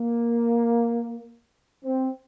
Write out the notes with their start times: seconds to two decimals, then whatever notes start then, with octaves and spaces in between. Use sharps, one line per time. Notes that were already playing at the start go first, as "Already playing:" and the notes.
Already playing: A#3
1.85 C4